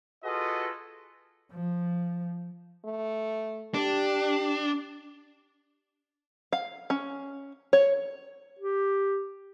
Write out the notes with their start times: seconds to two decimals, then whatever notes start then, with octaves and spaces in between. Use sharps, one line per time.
0.24 F4 F#4 G#4 A4 B4 D#5
1.52 F3
2.85 A3
3.74 D4 G4
6.53 F5
6.90 C#4
7.73 C#5
8.59 G4